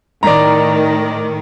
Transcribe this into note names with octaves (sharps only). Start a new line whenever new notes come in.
A2 D#3 A#4 D5 A#5